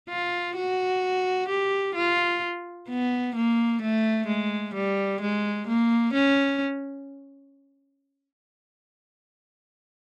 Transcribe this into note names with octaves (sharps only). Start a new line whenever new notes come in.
F4
F#4
G4
F4
B3
A#3
A3
G#3
G3
G#3
A#3
C#4